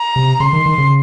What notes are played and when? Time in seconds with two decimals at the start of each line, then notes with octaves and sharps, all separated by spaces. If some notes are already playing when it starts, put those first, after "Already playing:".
Already playing: A#5
0.16 C3
0.40 C#3 C6
0.53 D#3
0.66 D#3
0.78 C#3